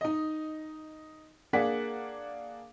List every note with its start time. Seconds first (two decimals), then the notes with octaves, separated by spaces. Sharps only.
0.01 D#4 D#5
1.53 A#3 D4 G#4 F#5 B6